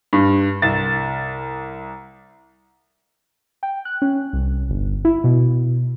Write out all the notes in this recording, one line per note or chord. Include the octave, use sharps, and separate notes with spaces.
G2
C2 A6
G5
F#6
C#4
C2
G1
E4
B2